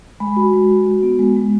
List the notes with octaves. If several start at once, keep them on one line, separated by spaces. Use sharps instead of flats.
G#3 B5
F#4
G#3
F#4
F#4
B3
G#3
G#3